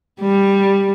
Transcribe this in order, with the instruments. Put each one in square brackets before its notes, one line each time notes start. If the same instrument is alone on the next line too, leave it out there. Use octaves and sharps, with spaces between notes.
[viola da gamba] G3